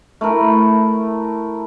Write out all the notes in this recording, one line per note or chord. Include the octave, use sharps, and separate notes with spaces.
A3 E4 A#4